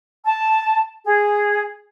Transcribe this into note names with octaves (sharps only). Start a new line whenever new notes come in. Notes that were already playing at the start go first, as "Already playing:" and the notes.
A5
G#4